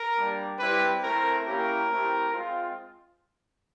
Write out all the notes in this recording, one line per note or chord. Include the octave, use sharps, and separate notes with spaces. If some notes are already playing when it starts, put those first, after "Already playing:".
Already playing: A#4
G3 A#3 D4
G3 C4 E4 G4 B4
A3 C4 E4 A#4
A#3 C#4 E4 G4 A#4
A3 C4 E4 G4
G#3 C4 F4